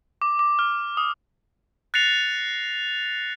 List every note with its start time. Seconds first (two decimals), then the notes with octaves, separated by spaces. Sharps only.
0.22 D6
0.39 D6
0.59 F6
0.97 D#6
1.94 F#6 A6 A#6 C7 C#7 F7